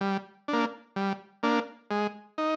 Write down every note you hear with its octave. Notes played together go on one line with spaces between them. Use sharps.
G3
A#3 D4
G3
A#3 D4
G#3
D#4